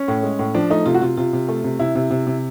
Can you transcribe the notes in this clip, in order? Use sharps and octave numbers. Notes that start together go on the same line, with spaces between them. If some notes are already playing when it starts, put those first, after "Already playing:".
Already playing: C#4
A2
G#3
A2
F3 D4
A3 D#4
C3 F4
F#4
C3 F4
C3 F4
C3
A3
C3
C3 E4
C3
C3
C3